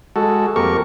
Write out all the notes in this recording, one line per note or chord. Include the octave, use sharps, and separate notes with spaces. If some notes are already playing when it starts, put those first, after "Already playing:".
G#3 F#4 A4
F2 A#3 G4 A#4 C#6